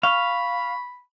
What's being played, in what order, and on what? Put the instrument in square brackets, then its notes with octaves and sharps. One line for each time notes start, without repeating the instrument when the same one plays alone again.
[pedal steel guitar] F5 [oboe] B5 [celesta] C#6